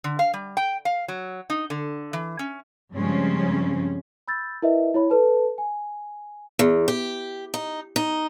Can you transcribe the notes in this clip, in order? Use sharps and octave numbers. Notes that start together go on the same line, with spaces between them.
D3
F5
G3
G5
F5
F#3
D#4
D3
E3
C#4
G2 C#3 F3 G#3 C4 C#4
B5 E6 G6 A6
E4 A#4 B4 D#5 E5
E4 C#5 B5
A4 B4 A5
G#5
E2
G4
D#4
D#4